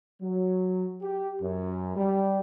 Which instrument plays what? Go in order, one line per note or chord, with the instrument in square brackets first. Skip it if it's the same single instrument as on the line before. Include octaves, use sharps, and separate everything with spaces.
[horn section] F#3
G4
F#2
G3